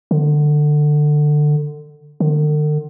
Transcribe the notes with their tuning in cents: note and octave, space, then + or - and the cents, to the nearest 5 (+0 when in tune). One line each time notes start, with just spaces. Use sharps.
D3 +20
D3 +45